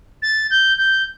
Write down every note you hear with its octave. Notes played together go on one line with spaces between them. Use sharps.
A6
G6
G6